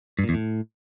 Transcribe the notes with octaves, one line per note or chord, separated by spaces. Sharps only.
G2
A#2
E2
A2